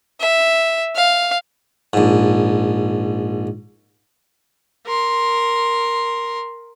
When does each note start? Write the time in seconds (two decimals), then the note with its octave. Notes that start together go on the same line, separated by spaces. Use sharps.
0.20 E5
0.96 F5
1.93 A#1 G#2
4.86 A#4 C6